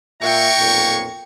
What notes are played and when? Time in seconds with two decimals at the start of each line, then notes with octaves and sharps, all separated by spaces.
0.22 A#2 G#3 E5 G5 A#5 C#6
0.58 B1 F2 A#2